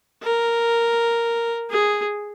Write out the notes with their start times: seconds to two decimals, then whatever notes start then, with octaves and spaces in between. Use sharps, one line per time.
0.23 A#4
1.70 G#4